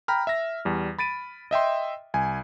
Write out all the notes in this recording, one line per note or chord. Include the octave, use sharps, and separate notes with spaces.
G5 A#5 B5 F6
E5 A#6
E2 G3
B5 A6 D7 D#7
D#5 E5 G5 C6
C2 G#5